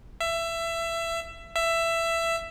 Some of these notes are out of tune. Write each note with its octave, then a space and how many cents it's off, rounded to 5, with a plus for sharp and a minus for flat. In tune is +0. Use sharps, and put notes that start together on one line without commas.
E5 +20
E5 +15